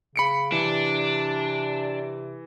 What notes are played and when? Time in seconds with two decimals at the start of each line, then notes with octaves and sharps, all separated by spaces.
0.16 C#3 B5 C#7 D7
0.52 C3 E3 D4